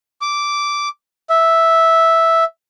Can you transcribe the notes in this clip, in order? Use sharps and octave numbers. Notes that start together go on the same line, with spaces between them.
D6
E5